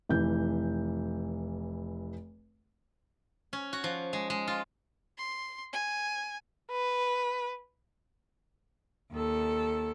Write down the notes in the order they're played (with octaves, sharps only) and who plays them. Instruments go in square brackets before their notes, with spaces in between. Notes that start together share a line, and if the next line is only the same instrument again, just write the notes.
[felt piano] F1 E3 G6
[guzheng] C#4
F#4
F3
G#3
G#3
F4
[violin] C6
G#5
[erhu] B4
[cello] D#2 A4